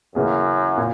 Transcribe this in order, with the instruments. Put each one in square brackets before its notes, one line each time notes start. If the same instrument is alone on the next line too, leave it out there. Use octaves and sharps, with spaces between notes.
[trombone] F#2 [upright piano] C#3 E3 A#3 C#4 G#4
[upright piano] A#2